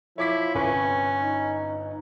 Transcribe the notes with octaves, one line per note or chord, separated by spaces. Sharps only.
F3 E4 C#5 D6 B6
G1 C3 C#4 B4 C#6
D#4